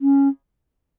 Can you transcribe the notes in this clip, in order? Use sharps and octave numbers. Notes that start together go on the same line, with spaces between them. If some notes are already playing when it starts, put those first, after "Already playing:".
C#4